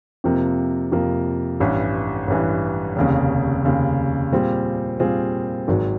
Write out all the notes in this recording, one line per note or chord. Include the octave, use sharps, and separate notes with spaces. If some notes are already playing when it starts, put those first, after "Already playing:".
F2 C3 F3 A#3
F2 C3 F3 A#3
A1 G2 E3
A1 G2 E3
F1 D#2 C#3
F1 D#2 C#3
A#2 G3 C4 F4 G#4
A#2 G3 C4 F4 G#4
G#1 G#2 D#3 F#3